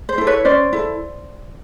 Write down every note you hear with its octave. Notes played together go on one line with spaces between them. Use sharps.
C5
E4 A4
B4 C#5
C#4 C5 D5
E4 A4